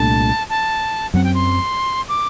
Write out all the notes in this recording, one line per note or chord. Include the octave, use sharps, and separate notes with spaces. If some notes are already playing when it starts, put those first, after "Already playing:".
Already playing: C2 A#2 A3 D4 A5
A5
F#2 F#3 C4 F#5
G5
C6
D6